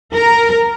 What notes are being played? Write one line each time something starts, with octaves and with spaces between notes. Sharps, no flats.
A#4